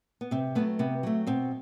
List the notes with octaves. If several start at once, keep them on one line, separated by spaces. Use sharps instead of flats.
B3
C3 C4
F#3 A3 B3
C3 B3
F#3 A3
B2 C4